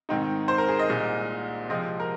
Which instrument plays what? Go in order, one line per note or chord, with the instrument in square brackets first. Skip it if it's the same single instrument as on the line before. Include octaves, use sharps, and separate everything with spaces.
[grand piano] G#2 D#3 C4 D#4
C5
A#4
G#4
D#5
C2 A#2 G#3
C3 F3 G#3 C4 D#5
A#4